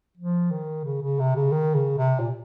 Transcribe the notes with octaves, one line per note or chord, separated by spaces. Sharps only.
F3
D#3
C#3
C#3
C3
C#3
D#3
C#3
C3
A#2